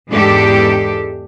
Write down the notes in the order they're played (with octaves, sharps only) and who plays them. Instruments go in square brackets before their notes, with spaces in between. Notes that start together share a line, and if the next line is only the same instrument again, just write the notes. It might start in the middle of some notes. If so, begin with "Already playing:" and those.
[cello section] E2 G#2 G#3 D4 G4 A4